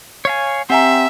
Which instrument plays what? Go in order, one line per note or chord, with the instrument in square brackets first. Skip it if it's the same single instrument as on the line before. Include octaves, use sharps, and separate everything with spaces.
[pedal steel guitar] C#5 F5 G#5
[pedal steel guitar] C4 G4 [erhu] E5 [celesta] F#5 G#5 A#5